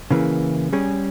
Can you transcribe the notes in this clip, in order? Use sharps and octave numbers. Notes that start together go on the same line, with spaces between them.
C#3 E3 A#3
G3 C#4 G#4